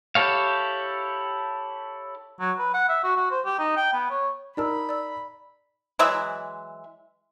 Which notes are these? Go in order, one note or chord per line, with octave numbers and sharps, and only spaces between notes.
E4 G4 A4 C#5 F5
F#3
B4
F#5
E5
F#4
F#4
C5
G4
D#4
G5
B3
C#5
D#4 A#4 D5 A5 B5 E6
D5 E6
E3 F#3 G#3 E5